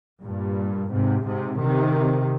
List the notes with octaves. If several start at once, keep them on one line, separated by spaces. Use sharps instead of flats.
G2 A#2
G#2 C3
G#2 C3
C3 D#3